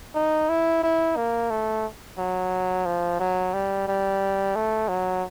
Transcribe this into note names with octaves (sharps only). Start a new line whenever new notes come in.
D#4
E4
E4
A#3
A3
F#3
F3
F#3
G3
G3
A3
F#3